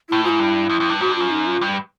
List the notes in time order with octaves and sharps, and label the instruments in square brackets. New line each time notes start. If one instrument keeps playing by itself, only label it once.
[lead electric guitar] A2 [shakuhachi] E4
[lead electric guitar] G#2 [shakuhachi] E4 F4
[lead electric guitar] G2
F2
F2
G2
[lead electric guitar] G#2 [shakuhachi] F#4
[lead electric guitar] G2
[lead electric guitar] F#2 [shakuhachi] F4
[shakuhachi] D#4
F4
[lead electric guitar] G2